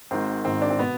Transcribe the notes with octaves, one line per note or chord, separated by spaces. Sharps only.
G#1 G#2 D#3 C4
G#1 G#2 D#3 C4
D4
C4
B2 B3